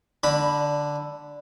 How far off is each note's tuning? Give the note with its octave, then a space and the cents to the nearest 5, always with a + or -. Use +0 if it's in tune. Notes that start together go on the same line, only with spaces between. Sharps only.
D3 +0 B5 +0